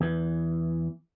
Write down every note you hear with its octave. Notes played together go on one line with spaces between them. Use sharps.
E2 E3